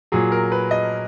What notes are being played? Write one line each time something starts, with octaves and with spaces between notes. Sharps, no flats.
A#2 F#3 G#4
A#4
B4
D#5